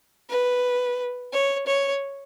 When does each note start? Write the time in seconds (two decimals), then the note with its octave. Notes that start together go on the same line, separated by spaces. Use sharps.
0.29 B4
1.33 C#5
1.67 C#5